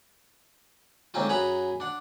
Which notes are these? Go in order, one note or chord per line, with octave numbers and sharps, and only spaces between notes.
G#2 D3 C4 C#4 D#4 F4
F#2 G#4 F#5 A#5 B5 D#6
D4 F#5